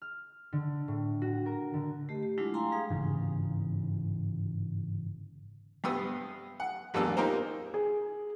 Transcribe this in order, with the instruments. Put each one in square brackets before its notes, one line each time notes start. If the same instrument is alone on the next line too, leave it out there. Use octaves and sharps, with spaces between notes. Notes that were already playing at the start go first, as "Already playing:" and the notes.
[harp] F6
D3
A2
F#4
A#4
D3
[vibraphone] A3 G4 D#5
G4
F#3 G#3 A3 D4 E4 F4
F5 G5 G#5 A#5 C6
G3 G#4 F5 D#6
[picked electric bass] G1 G#2 C#3 E3
[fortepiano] G2 C3 B3 G5 D#6 E6
F#5
A1 E2 A#3 D4 A5 E6
A#3 D#4 F4 G4 A#4 C5
[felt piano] G#4